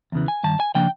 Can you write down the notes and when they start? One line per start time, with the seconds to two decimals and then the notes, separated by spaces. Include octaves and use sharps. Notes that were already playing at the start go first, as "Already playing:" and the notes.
0.12 E2 C#3 E3
0.28 G#5
0.43 G2 D#3 A5
0.60 G#5
0.75 C#3 F3 A#3 D4 G5